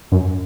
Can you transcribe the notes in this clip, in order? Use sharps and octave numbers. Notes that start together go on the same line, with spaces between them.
F#2